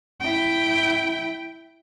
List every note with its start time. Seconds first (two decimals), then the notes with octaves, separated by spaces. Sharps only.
0.20 E4 G5